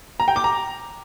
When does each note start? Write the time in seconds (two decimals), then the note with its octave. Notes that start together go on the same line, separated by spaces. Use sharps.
0.20 A#5
0.28 G5
0.36 D6
0.44 A#5